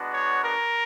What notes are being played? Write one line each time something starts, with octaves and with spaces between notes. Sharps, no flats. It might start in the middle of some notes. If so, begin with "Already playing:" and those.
Already playing: G#3 B3 D4 F#4
C#5
A#4